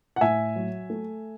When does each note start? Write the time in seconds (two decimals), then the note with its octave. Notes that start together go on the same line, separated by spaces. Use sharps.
0.16 F#5
0.21 A2 E5 G#5
0.56 F#3
0.90 A3